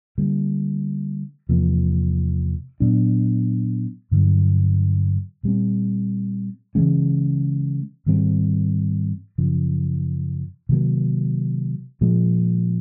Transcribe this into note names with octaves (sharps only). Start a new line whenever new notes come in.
D3 G3 A#3
E2 C3 F3 A#3
A#2 F#3 B3 D4
G2 D3 F#3
A#2 G3 C4
C#3 E3 G#3 C#4
G#2 D#3 G3 C4
F#2 C#3 F3
C3 D#3 F#3 A#3
A#2 F3 G#3